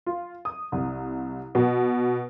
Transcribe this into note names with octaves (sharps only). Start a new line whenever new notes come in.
F4
D#6
C2
B2